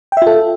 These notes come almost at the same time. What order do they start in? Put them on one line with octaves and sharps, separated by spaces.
G5 E5 F4 A4